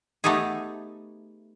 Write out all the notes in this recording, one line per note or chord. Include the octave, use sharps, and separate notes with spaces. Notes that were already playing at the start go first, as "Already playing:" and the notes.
A3 B3 D#4 G4 G#4